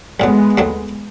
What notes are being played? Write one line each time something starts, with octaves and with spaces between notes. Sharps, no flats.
B1 A2 F#3 G#3 B3
D#2 D#3 F#3 A3